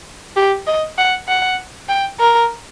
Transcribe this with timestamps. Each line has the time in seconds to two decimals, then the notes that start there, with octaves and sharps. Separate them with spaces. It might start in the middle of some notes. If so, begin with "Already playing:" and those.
0.36 G4
0.67 D#5
0.98 F#5
1.28 F#5
1.89 G5
2.20 A#4